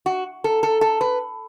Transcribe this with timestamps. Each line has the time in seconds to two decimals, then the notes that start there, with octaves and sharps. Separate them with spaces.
0.06 F#4
0.44 A4
0.63 A4
0.81 A4
1.01 B4